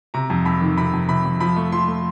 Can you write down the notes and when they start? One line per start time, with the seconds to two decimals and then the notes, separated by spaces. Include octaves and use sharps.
0.14 C3 A#5
0.30 F2
0.45 F2 B5
0.61 D#3
0.77 C3 B5
0.93 F2
1.09 C3 B5
1.25 F2
1.40 F3 B5
1.56 A3
1.72 F3 C6
1.88 A3